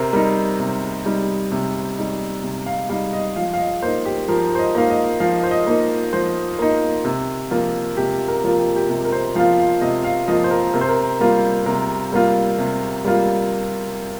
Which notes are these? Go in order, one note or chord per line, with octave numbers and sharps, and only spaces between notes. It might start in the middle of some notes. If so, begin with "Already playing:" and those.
Already playing: C3 A#4 C5
G3 D#4 A#4
C3
G3 D#4
C3
G3 D#4
C3
F5
G3 D#4 F5
D#5
F3 F5
F5
D#5
A#3 D#4 C5
G4
F3 A#4
C5
D#5
A#3 D#4 F5
D#5
F3 F5
C5
D#5
A#3 D#4
F3 C5
A#3 D#4
C3
F3 A#3 F4
C3 G4
A#4
F3 A#3 F4
G4
G4
C3 G4
A#4
C5
F3 A#3 F4 F5
F5
C3 D#5
F5
F3 A#3 F4 D#5
C5
A#4
C3 A#4
C5
A#4
G3 A#3 F4
C3 A#4
G3 A#3 F4
C3
G3 A#3 F4